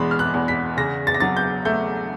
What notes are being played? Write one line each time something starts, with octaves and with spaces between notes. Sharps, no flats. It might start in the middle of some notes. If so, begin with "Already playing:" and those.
Already playing: E2 B2 G#3 B5 C6
F6
F#6
E2
B6
C#3 A#6
A6
A#6
F#3 A6
G6
A3 G6